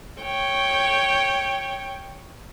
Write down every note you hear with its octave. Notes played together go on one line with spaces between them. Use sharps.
C#5 G5